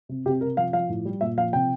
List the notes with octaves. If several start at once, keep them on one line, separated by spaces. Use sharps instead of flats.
C3
C3 G4
C3 A#4
F3 F5
F3 F5
A2
G3
A#2 E5
F3 F5
C3 G5